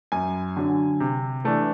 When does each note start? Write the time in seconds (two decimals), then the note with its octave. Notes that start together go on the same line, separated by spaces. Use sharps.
0.12 F#2 G#5
0.57 D3 F#3
1.00 C3
1.44 E3 A3 D4